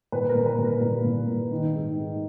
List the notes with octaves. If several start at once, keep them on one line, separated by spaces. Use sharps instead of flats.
A#2 B4
A#4
A#2
B4
A#2
A#4
A#2
A#2
A#2
D#3
G#2
G#2